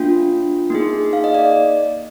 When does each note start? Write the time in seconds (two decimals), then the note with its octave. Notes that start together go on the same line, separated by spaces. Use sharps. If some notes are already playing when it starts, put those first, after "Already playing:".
Already playing: A#3 D4 F4 G5
0.70 A#3 D#4 G#4
1.13 F5
1.24 D#5
1.35 D5
1.45 D5